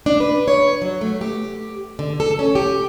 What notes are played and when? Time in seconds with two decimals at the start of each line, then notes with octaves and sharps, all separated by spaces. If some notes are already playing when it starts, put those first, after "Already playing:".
0.06 D4
0.20 B4
0.48 C#5
0.82 F#3
1.01 A3
1.21 G4
1.99 D3
2.20 A4
2.39 C#4
2.55 G4